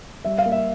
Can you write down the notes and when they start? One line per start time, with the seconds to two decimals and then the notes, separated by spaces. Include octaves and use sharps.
0.25 G3 E5
0.38 F5
0.45 A#3
0.52 E5